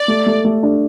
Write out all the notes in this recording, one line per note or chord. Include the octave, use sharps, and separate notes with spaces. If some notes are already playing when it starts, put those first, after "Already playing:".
Already playing: D5
A3
A3
A3
D4